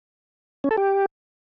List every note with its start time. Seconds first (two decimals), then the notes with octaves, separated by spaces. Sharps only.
0.64 C#4
0.71 A4
0.77 G4